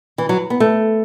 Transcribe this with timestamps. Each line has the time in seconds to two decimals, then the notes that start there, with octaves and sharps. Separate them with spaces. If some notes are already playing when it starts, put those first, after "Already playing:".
0.18 E3
0.29 F#3
0.50 B3
0.60 A3